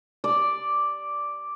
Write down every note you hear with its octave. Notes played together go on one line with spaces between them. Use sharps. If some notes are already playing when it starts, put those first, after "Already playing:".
D5